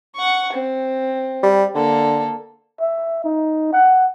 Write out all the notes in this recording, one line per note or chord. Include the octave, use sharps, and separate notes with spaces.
F#5 C#6
C4
G3
D3 A#3 A4
E5
D#4
F#5